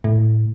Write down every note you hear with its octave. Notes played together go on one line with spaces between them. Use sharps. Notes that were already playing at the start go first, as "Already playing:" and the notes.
A2